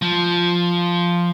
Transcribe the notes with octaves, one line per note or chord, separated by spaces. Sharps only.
F3